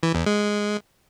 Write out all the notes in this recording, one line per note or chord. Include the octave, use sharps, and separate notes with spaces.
E3
E2
G#3